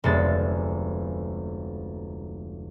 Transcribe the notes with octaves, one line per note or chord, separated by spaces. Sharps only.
F1 D2 G#3 B3 A6